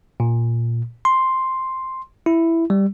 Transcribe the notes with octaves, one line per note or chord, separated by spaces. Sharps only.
A#2
C6
E4
G3